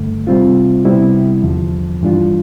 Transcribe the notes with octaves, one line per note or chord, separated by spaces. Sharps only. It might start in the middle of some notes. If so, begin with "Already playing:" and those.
Already playing: G2 D3 A3
C3 G3 C4 F4
C3 G3 B3 E4
E2 D3 F3
G2 E3 G3 D4 F4